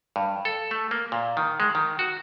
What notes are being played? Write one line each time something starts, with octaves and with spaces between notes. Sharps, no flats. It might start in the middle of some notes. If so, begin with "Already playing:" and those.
G2
A4
A3
A#3
A#2
D#3
G#3
D#3
F#4